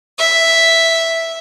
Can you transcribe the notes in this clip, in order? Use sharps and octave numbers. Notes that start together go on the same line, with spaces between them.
E5